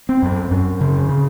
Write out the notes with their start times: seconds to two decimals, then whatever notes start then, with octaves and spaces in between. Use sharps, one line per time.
0.09 C4
0.22 F#2
0.51 F#2 C#4
0.81 C#3
1.09 C#3